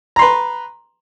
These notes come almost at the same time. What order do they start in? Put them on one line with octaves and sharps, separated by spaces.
A#5 C6 B4